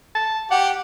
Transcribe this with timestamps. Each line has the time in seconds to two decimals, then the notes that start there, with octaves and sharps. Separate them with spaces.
0.15 A5
0.51 G4 F#5